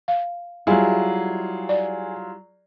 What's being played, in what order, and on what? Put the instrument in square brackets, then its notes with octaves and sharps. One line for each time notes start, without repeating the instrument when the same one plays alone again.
[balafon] F5
[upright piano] F#3 F4 [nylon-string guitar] G3 E4 [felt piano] G#4
[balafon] D5